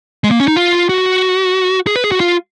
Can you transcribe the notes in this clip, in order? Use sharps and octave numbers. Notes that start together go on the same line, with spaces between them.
G#3
A#3
C#4
D#4
F4
F#4
G#4
B4
G#4
F#4
F4